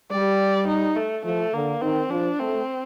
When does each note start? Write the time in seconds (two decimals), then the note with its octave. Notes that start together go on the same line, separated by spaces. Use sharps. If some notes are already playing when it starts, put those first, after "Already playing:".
0.11 G3 D5
0.67 D#4
0.96 A3
1.24 F3 A3
1.53 D3 A#3
1.81 D#3 C4
2.10 F3 D4
2.39 A3 C4